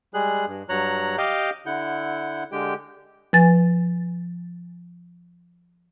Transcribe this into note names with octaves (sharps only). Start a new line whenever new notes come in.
G3 G#3 G#4 F#6
G2
G2 F#3 C#5 A#5 F#6
G4 D#5 F5 D6 G6
D3 E4 F#5 G6
D3 G#3 G4 G5
F3 B4 G#5 A6